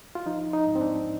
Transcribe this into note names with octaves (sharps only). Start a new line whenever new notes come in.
F4
F3 D#4
D#4
G#2
C4
D4